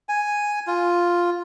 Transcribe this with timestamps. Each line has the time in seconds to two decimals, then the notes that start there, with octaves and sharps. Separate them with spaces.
0.09 G#5
0.67 F4